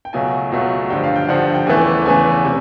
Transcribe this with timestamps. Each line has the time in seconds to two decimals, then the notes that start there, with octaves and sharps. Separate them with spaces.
0.05 G5
0.13 C#2 B2 F#3 A3 G#5
0.52 C#2 B2 F#3 A3
0.90 G2 D3 F3 G5
1.04 F5
1.16 G5
1.29 G2 D3 F3 F#5
1.54 G5
1.66 E2 C#3 E3 A3 G#5
2.05 E2 C#3 E3 A3 G#5
2.45 C3